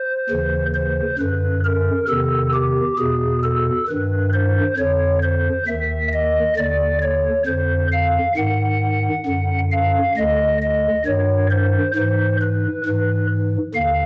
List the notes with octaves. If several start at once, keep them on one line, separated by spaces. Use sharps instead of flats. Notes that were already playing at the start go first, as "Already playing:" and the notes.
Already playing: C5
D#2 C#3 E3
C5
F#2 D3 B4
A#4
E2 C3 D#3 A4
G4
E2 B2 G#4
A4
G2 D#3 B4
C5
F2 D3 C#5
C5
D#2 D#3 E5
D#5
D#2 D3 D5
C#5
F2 D3 C5
F5
G#2 D#3 F#5
F#2 D3
F5
D2 D3 D#5
D#5
G2 D#3 C#5
C5
G#2 E3 C5
B4
G#2 E3 B4
D#2 D3 F5